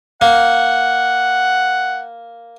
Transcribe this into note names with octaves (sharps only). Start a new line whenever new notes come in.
A#3 F#5